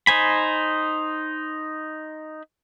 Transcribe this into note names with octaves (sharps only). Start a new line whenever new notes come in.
D#4 C5 G#5 B5